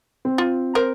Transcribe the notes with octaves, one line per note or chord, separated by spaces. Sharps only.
C4
F4
A#4 C5